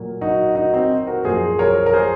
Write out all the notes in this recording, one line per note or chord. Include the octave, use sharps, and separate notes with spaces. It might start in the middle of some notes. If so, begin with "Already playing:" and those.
Already playing: A#2 F#3 A#3
D#4 F#4
D#4 F#4
C4 D#4
F#4 A#4
F#2 F3 A#3 G#4 C5
A#4 C#5
A#4
G#4 C5